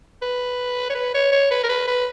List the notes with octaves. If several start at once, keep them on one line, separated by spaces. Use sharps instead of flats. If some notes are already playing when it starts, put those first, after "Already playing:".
B4
C#5
B4
C#5
C#5
B4
A#4
B4
B4